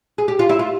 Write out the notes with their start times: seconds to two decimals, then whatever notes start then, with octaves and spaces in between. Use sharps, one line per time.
0.18 G#4
0.28 G4
0.39 F4
0.49 E4
0.59 F4